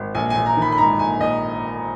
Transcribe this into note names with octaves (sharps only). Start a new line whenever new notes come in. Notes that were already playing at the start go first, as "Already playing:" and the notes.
Already playing: G#1
A#1 G#5
A#1 G#5
A#5
D#3
B5
B5
G#2 A#5
A#1 G#5
A#1 D#5